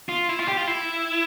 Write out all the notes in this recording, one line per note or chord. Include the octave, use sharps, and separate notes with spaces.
F4
E4
F4
G4
F4
E4